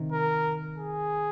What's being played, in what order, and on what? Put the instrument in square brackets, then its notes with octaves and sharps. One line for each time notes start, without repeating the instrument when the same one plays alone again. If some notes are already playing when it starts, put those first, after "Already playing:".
Already playing: [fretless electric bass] C3 D#3
[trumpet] A#4
G#4